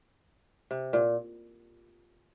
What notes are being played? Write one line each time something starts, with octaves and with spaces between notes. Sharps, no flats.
C3
A#2